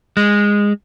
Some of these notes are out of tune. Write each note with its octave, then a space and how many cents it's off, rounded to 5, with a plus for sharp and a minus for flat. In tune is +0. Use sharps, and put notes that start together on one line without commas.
G#3 -15